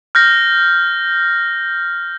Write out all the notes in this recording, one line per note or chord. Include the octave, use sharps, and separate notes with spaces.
F6 G6 A#6